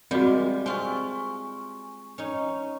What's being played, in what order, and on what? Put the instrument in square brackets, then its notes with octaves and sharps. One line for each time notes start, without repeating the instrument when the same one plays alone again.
[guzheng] G3 G#3 G4 [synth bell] C4 F#4
[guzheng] C4 F4 [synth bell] G#5 C#6
[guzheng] C#4 D#4